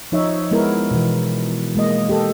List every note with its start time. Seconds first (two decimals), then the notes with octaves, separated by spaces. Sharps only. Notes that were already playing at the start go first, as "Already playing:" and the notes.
0.12 F3 D#4 C#5 E5
0.51 G#3 B3 E4 A#4
0.91 B2 E3
1.75 G#3 A#3 D#5
2.09 G4 A4